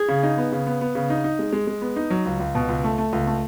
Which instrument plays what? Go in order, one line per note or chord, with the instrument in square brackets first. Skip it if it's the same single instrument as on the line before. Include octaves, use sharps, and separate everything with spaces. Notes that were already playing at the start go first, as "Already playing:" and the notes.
Already playing: [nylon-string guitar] G#4
[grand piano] C#3
D#4
B3
C#3
B3
B3
C#3
D#4
D#4
G#3
G#3
G#3
B3
D#4
F#3
C#2
C#2
B2
C#2
A3
A3
C#2
A3